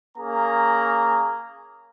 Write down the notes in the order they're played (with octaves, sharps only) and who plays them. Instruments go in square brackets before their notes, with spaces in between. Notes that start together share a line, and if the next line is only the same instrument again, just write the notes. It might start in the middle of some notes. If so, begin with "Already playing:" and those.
[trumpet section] A#3 C#4 G#4 A#5